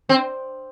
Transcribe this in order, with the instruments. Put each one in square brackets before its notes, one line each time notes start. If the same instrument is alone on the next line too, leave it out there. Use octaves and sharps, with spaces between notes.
[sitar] C4